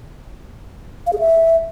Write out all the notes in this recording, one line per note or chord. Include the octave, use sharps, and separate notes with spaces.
F5
G#4
E5